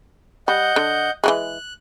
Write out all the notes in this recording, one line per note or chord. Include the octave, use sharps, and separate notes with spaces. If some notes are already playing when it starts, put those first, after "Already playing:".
G3 D#5 F#5 G6
D3
E3 G3 G#3 F#6